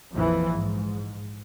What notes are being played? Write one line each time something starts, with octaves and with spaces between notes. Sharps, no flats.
A#1 F2 E3 F3
G#2